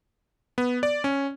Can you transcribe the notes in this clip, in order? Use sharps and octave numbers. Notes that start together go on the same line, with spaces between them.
B3
D5
C#4